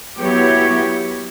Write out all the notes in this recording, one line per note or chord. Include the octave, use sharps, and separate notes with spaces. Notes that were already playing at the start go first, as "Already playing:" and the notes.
F#3 B3 E4 G4 C#5